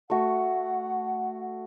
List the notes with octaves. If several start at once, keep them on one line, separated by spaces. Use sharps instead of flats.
A3 F#4 F#5